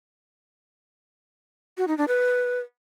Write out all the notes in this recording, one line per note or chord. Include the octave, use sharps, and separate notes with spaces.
F#4
D#4
D4
B4